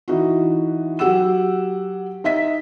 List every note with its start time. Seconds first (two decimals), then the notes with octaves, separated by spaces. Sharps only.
0.08 E3 D#4 F#4
0.99 F#3 G4 F#5 E6 E7
2.24 D#4 D#5 E5 B6